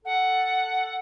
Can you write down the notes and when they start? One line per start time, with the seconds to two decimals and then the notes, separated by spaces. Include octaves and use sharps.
0.05 A4 F#5